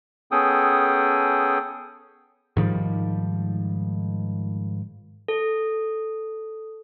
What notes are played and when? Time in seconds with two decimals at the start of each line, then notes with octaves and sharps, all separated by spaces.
0.31 B3 C#4 G#4 A4 G5 D#6
2.57 G#2 D#3 F3 G3
5.28 A4